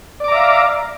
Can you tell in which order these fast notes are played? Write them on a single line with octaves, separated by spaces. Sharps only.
D5 D6 A#5 E5 F5